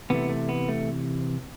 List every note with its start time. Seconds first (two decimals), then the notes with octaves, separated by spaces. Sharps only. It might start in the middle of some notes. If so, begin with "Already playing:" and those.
0.10 C3 E3 A3 B3
0.29 A3
0.49 B3
0.69 A3